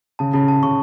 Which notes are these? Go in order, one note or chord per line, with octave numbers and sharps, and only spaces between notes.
C#3 A5
C#3 A5
A5
C#3 C#6